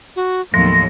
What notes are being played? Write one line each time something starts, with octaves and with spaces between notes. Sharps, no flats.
F#4
D#2 A2 F3 F#3 B3 C6 A#6